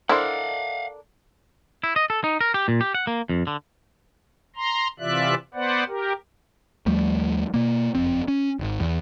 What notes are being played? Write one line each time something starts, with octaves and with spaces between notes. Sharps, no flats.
D4 E4 A4 A#4 C5 F5 F#5
E4
D#5
A4
D#4
A#4
G4
A#2
G4
F#5
A#3
F2
D3
A#5 C6
C3 E3 F4 D5 E5 F#6
B3 B4 C5 D5 F#5
G4 A#4
D#2 F3 G3 A3
B2 A#3
F#1 F2 C4
C#4
D#1 G#1
E2